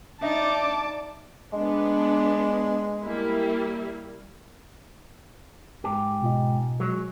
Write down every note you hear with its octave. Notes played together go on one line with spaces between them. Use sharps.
D#4 D5 E5 A5 D6
G#3 B3 D4
G3 A#3 E4
G#2 G4
B2 F4 D#5
F#3 G#3